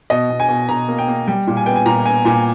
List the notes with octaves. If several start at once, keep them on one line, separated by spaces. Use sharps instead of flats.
B2 D#5
B2
G#5
B2
B2 A#5
A#3
G5
A#3
G3 G5
A#2
G#5
B3 G5
G#5
A#2 A#5
B3 G#5
A#2 G#5